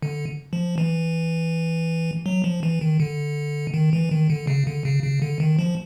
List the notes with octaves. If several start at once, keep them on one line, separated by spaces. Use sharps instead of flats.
D3
F3
E3
F#3
F3
E3
D#3
D3
D#3
E3
D#3
D3
C#3
D3
C#3
C#3
D3
D#3
F3